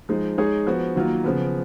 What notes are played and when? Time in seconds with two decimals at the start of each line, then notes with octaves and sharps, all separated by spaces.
0.09 F3 G#3 D#4
0.38 G#3 D#4 G#4 C#5
0.67 F3 B3 F#4
0.96 D#3 F#3 A#3 F4
1.24 C#3 F3 B3